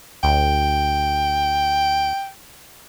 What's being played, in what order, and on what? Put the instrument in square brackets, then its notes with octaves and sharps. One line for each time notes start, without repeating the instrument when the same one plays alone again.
[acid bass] D2 [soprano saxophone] G5